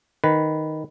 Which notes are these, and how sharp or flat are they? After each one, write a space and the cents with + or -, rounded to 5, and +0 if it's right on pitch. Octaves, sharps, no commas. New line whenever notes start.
D#3 +0 B4 +0